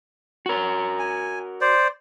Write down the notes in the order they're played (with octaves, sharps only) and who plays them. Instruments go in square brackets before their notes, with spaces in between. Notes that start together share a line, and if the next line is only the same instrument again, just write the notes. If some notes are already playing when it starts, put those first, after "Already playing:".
[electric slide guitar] F#4 A#4
[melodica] G#5
C5 D5